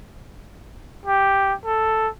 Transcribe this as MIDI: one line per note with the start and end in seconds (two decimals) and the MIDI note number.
1.06 1.53 67
1.65 2.08 69